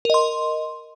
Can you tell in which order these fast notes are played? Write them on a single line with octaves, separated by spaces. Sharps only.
A#4 D#5 C6